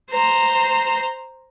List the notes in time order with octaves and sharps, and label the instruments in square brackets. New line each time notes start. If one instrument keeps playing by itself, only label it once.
[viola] C5 A#5